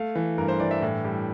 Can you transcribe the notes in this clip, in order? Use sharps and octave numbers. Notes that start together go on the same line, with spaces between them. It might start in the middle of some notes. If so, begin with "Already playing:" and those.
Already playing: A3 F5
E3
G2 A#4
C5
E3 D5
E5
A2
G3